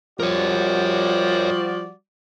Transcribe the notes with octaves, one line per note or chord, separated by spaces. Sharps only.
F3 G3 F#4 A#4 C#5 D5